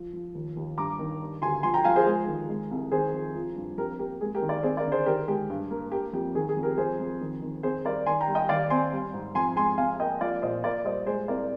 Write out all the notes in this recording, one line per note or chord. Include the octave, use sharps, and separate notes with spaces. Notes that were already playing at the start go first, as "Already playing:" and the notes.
Already playing: F3
F3
D#2
D#2
G2 A#5 D6
D#3
G3
D2 G#5 C6
F3 G#5 C6
G5 A#5
F3 F5 G#5
G#4 C5
G#3 G#4
D#3
G#3
C2
D#3 G#4 C5
F2
F3
G2
F2 G4 A#4
A#3 G4 A#4
G#3 G#4
G4 A#4
D#3
A#4 D5
C4 G#4 C5
A#4 D5
D3
G#4 C5
D#3 G4 A#4
G#3 G4
G2
A#3
A#3 G4
F2 G4
D#3 G#4
G#4
F2
G4 A#4
F2 G#4 C5
F2
D#3
D#3
C4 G#4 C5
G3 A#4 D5
D#3 G#5 C6
G5 A#5
G3
D#5 G5
D#2 D5 F5
C4 G#5 C6
G3
G#2
F2 G#5 C6
G#3 G#5 C6
C3 F5 G#5
A#3 D#5 G5
F3 D5 F5
A#2 C5 D#5
A#2 A#4 D5
G3 C5 D#5
G#3 G#4 C5
C2 A#4 D5